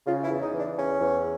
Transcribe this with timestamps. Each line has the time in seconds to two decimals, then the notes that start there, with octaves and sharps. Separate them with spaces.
0.06 C#3 F4
0.24 E4
0.30 E2
0.41 D#4
0.53 E3
0.59 D4
0.76 E2 C#4
1.00 E2